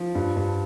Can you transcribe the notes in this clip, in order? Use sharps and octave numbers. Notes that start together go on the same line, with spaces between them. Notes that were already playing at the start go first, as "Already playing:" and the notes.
Already playing: F3
G2
G2